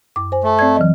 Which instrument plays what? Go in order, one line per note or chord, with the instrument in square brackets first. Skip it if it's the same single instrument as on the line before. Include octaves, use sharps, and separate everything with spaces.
[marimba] F#2 D6
C5 G#5
[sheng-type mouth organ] A3
[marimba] C4 D5 G#6
E3 F#3 D#5